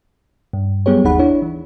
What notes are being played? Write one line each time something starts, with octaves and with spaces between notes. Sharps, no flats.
G2
F#3 G3 B3 G4 G#4 C#5
G1 D#2 D#4 G#4 F#5 B5
D4 E4 C#5
E3